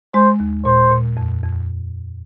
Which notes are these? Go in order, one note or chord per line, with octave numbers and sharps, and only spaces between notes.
G#3 C5
D#2
A#2 C5
A#2
F2
F2